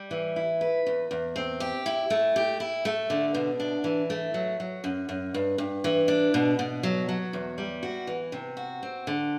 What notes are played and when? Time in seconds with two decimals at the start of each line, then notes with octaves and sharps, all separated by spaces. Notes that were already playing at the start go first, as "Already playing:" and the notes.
Already playing: G3
0.11 E3
0.36 E4
0.61 B4
0.86 E2
1.11 E2
1.36 C4
1.60 G4
1.86 E4
2.10 A3
2.36 G4
2.60 E4
2.85 A3
3.10 D3
3.34 B2
3.60 D4
3.84 E3
4.10 A3
4.34 F#3
4.60 F#3
4.84 F#2
5.09 F#2
5.34 G2
5.58 G2
5.84 E3
6.08 D4
6.34 B2
6.59 B2
6.83 F#3
7.09 F#3
7.33 E2
7.58 G3
7.83 F#4
8.07 E3
8.32 C3
8.57 F#4
8.83 C4
9.07 D3